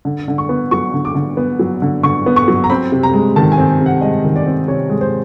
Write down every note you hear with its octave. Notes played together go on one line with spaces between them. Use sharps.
D3
D3
C#6
B3
F#3 C#6
D3
D6
D3
B3
F#3
D3
D3 C#6
B3
C#6
F#3
A#5
C4 B5
C3
A#5
G#3
D#3 A5
G#5
C4
C3
F#5
G#3 D#5
D#3
D5
C4
C3 C#5
G#3
C5